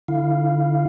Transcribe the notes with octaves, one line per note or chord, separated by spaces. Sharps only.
D3 E4 F5